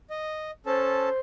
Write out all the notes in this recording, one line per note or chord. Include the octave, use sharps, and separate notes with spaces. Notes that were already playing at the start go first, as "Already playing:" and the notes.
D#5
C#4 A4 C5 A5